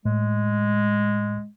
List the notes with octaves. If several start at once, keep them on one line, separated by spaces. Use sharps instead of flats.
A2 G#3